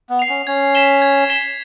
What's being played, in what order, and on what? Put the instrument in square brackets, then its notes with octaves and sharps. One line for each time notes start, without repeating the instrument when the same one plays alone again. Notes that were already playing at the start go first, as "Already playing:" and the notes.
[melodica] B3
[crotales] C7 F7
[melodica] C#4
[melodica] C#4 [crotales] G#6
[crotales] B6 E7 G7
G#6
B6 E7 G7